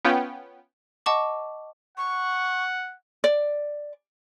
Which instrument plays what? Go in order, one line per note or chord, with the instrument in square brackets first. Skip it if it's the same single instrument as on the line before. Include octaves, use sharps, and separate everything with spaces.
[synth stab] B3 C#4 F4 G5
[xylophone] D#5 F#5 A5 C#6 D6
[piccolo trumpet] F#5 [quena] C#6
[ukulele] D5